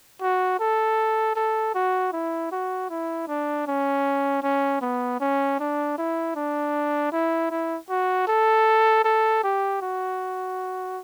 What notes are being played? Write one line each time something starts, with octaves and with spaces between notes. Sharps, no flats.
F#4
A4
A4
F#4
E4
F#4
E4
D4
C#4
C#4
B3
C#4
D4
E4
D4
E4
E4
F#4
A4
A4
G4
F#4